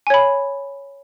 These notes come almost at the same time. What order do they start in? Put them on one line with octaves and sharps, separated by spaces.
G#5 C#5 B5